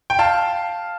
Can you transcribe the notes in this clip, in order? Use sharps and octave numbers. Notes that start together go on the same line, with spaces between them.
G5
F5 A5